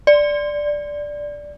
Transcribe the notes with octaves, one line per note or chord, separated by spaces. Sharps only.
D5